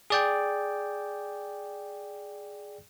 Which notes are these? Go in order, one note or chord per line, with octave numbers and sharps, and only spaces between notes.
G#4 D5 G5